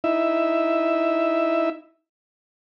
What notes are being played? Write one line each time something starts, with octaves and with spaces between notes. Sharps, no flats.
D#4 E4 E5